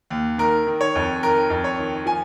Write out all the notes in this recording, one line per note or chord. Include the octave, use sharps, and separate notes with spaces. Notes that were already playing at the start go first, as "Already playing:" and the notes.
D#2
D#3 A#4
D#3
C#5
F2
D#3 A#4
F2
C#5
D#3
F3 G#5